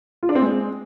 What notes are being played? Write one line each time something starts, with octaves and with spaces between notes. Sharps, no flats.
F4
D4
C4
G#3